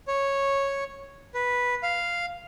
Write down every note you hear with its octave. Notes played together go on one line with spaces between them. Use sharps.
C#5
B4
F5